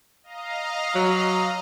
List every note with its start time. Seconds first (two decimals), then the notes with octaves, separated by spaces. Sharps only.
0.23 D#5 F5 A#5
0.95 F#3